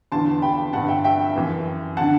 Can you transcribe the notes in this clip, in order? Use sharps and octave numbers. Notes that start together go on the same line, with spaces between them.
E2 D3 A5 C6
G5 B5
G2 D3 F#5 A5
E5 G5
E5 G5
F#2 E3
D3 F#5 A5